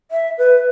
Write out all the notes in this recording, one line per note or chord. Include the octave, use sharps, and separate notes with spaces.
E5
B4